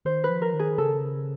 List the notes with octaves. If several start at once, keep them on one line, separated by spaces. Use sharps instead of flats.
D#3 C5
B4
F3
A#4
D#3
G#4
C#3 A4